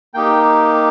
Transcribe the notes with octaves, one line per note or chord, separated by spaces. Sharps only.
A#3 D#4 G4 G5